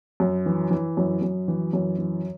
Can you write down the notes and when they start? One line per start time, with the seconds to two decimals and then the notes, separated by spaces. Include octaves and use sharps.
0.20 F#2
0.46 E3
0.71 E3
0.97 F#2
1.22 F#2
1.48 E3
1.73 F#2
1.98 E3